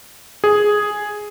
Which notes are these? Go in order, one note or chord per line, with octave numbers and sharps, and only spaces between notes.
G#4